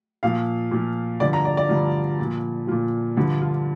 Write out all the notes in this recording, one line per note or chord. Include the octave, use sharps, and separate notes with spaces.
A#2 F3 F5
A#2 F3
G2 D3 F3 D5
A#5
D5
D5
G2 D3 F3 F4
A#2 F3
A#2 F3 F4
G2 D3 F3 D4
F4